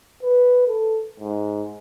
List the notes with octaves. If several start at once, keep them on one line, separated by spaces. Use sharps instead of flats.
B4
A4
G#2